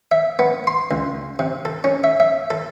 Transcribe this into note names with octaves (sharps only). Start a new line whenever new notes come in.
E5
B3
C6
C#2
C3
A4
C#4
E5
E5
A4